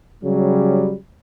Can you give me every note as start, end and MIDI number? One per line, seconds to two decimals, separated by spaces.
0.23 0.95 49
0.23 0.95 54
0.23 0.95 55